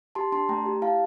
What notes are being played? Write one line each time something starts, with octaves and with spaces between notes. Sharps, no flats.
G4 A5 C6
D4 A5 C6
A3 G5 A#5
G4
E4 F5 A5